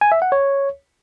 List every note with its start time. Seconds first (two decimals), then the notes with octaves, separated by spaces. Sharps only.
0.01 G#5
0.12 E5
0.22 F#5
0.32 C#5